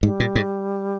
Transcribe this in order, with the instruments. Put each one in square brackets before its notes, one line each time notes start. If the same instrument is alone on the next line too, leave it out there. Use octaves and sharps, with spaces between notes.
[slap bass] G#2 [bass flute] G3
[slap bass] A#2
G#2